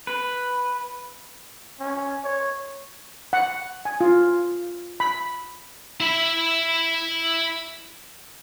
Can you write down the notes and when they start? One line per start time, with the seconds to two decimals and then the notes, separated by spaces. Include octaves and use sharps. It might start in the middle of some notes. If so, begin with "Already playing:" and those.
0.07 B4
1.80 C#4
2.24 C#5
3.33 F#5
3.85 G#5
4.01 F4
5.00 B5
6.00 E4 B5